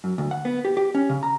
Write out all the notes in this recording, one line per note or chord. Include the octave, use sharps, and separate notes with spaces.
F#2
D2
F#5
B3
G4
G4
C#4
C#3
A#5